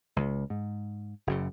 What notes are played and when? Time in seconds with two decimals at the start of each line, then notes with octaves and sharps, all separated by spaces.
0.16 C#2
0.50 G#2
1.27 F#1 F#2 C#3